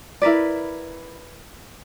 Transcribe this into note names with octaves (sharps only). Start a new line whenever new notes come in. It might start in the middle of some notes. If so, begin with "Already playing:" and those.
E4 A#4 B4 D5